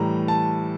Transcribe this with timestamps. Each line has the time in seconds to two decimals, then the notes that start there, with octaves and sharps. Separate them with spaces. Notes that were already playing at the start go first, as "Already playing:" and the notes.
Already playing: A2 E3 G3 A#5
0.28 A5